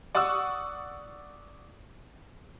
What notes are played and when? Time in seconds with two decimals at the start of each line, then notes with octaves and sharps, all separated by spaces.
0.15 D5 F#5 C#6 D#6 E6